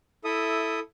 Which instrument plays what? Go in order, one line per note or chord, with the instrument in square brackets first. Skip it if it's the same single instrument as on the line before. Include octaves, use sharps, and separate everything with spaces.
[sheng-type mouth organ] E4 A4 E5 D#6